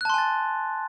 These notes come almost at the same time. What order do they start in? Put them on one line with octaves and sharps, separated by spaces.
F#6 A5 C6 G#5 A6